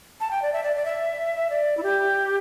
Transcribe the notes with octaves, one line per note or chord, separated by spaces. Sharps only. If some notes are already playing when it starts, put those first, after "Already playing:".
A5
G5
D5
E5
D5
D5
E5
D5
E4
G4